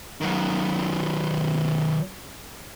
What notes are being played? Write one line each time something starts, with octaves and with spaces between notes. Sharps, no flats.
D#3 F#3